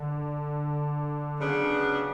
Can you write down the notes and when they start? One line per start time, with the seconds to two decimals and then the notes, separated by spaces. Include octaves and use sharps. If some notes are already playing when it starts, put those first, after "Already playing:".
Already playing: D3
1.38 C#3 F#3 B3 D4